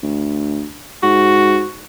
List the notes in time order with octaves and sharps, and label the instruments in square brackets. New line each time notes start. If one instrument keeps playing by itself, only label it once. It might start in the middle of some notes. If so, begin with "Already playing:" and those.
[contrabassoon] D2
[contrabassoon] G#2 [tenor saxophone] F#4